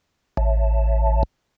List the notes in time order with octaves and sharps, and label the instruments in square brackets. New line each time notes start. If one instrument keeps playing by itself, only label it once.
[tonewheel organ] A1